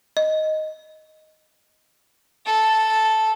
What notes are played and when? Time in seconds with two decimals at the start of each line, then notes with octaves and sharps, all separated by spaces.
0.17 D#5
2.46 A4